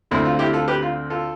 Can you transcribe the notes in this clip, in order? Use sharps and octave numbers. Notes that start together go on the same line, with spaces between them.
D2 D3 A3 C4 E4
F4
E4 G4
F4 A4
G4 B4
F4
F4 A4